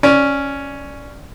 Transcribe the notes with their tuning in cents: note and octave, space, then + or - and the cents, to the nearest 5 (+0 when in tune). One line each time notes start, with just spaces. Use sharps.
C#4 +0 D5 +0